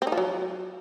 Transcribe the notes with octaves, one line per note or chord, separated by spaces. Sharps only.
C4
D#4
F3
F#3